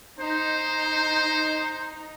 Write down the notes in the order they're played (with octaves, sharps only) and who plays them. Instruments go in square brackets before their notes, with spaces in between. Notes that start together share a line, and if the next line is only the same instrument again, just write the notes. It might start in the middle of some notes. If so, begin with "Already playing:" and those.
[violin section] D#4 [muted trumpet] C5